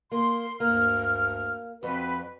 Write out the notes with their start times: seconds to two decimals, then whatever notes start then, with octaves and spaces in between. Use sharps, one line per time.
0.12 A#3 C6
0.60 D2 G2 A#3 F6
1.83 F2 C4 F#4 B4